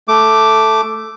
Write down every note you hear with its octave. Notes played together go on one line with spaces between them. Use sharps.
A3 D6